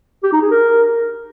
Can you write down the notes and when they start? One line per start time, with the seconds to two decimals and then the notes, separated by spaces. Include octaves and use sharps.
0.23 G4
0.33 D#4
0.42 G#4
0.51 A#4